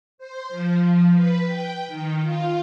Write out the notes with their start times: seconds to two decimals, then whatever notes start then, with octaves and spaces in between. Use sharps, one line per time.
0.18 C5
0.49 F3
1.13 B4
1.45 G5
1.87 D#3
2.22 F4